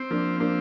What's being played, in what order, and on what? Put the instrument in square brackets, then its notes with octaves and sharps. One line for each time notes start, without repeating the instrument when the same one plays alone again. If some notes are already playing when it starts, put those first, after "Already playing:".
Already playing: [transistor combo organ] C4
[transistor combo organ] F3 [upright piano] A#3 D4
[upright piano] A#3 D4 [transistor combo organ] C4